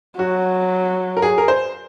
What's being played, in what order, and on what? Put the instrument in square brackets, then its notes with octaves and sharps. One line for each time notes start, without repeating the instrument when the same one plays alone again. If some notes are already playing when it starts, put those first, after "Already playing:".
[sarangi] F#3 [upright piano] F#4
[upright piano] A#4
G#4
A#4
C5